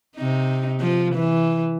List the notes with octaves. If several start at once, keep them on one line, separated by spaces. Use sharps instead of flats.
C3 D#4
F3
E3